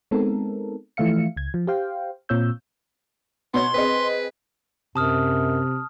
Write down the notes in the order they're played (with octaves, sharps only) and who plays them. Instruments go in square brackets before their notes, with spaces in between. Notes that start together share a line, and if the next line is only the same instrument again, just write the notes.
[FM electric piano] G#3 B3 C4 D#4 A4 A#4
E3 F3 A3 E5 F5 C#7
C#2 G#6
F3
G4 C5 F5 G5
A#2 C4 F4 C#5 E6 G6
[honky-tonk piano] B2 C#5 [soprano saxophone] B3 [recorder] C6
[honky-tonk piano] C4 G#4 D#5 [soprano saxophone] B4
[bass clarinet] F#2 [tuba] C3 [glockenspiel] A5 D#6 F6